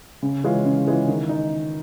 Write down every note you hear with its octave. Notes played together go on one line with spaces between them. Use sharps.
C#3
E3 G#3 C#4 F4
C#3
E3 G#3 C#4 F4
D#3
D#4